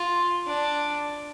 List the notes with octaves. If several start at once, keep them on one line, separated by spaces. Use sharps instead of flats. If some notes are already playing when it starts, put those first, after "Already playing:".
Already playing: F4
D4